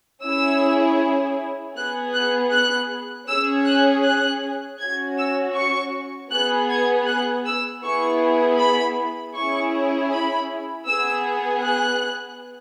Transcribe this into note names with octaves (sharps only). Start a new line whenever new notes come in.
C#4 E4 G#4 E6
B3 G#4 F#6
F#6
F#6
C#4 G#4 E6
F#6
F#6
C#4 F#4 G#6
E6
C#6
B3 G#4 F#6
G#6
F#6
E6
B3 E4 G#4 C#6
B5
C#4 E4 G#4 C#6
B5
B3 G#4 E6
F#6